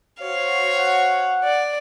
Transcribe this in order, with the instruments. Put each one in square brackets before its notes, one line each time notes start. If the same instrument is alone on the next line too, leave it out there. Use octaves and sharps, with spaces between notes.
[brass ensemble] F#4 C5 C#5 [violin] F5
[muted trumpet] F#5
[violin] D5